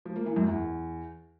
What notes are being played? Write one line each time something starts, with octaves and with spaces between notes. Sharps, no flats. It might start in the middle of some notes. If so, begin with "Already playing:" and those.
F3
A#3
E3
F#2
E2